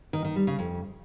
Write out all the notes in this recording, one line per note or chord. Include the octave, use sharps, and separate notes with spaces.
D#3
D#3
G3
C#3
F2